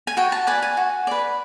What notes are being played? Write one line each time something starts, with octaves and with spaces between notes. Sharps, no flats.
G#5
F#4 G5
A5
B4 D5 G#5
G#5
F#4
B4 D5